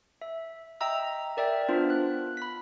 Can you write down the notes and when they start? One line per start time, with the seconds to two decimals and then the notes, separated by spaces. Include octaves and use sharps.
0.22 E5
0.81 D#5 E5 G5 A#5 E6
1.37 A#4 D5 E5 G5
1.68 B3 D4 F4 C5
1.90 F#6
2.37 B5 B6